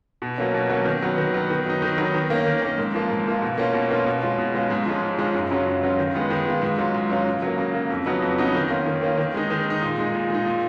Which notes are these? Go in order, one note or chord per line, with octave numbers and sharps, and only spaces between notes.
B2
F#3 A#3 C#4
B2
F#3 A#3 C#4
D#3
F#3 B3
D#3
F#3 B3
D#3
F#3 B3 D#4
D#3
F#3 B3 D#4
D#3
A#3 C#4
D#3
A#3 C#4
G#2
F3 A#3 F4
G#2
F3 A#3 F4
B2
A#3 C#4 F4
B2
A#3 C#4 F4
B2
G#3 C#4 F4
B2
G#3 C#4 F4
G#2
F3 G#3 C#4 F4
G#2
F3 G#3 C#4 F4
F#2
C#3 F#3 C#4 F4
F#2
C#3 F#3 C#4 F4
D#3
G#3 B3 F4
D#3
G#3 B3 F4
G#2
F#3 C#4 F4
G#2
F#3 C#4 F4
C#3
F#3 A#3
C#3
F#3 A#3
F2
C#3 F#3 B3 D#4
F2
C#3 F#3 B3 D#4
D#3
A#3 C#4 F4
D#3
A#3 C#4 F4
D#3
G#3 D#4
D#3
G#3 D#4
A#2
G#3 D#4
A#2
G#3 D#4
A#2